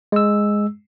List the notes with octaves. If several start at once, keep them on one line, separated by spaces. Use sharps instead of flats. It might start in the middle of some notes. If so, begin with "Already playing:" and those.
G#3 E6